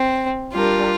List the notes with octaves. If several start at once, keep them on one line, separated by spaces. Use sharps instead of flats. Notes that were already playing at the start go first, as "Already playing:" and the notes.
Already playing: C4
G3 D4 F4 G4 A#4